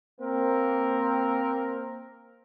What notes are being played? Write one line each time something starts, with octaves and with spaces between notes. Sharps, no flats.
A#3 C4 A#4